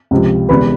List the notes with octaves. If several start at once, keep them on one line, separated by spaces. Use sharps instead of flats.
C#2 C3 F3
E1 E2 C3 B4 B5